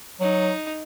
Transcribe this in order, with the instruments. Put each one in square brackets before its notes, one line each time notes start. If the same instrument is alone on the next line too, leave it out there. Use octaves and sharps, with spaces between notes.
[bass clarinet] F#3 [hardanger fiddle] D#4